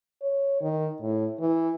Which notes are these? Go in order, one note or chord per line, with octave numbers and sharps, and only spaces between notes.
C#5
D#3
A2
E3